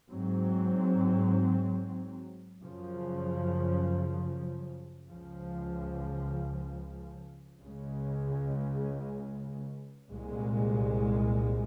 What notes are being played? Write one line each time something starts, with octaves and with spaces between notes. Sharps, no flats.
G#2 F#3 C4
F#2 C#3 F3
C#2 C#3 F3
C#2 C#3 G#3
C2 A#2 G#3